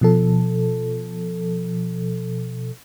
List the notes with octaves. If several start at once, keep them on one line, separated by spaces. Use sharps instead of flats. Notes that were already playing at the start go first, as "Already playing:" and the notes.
B2 F3 A4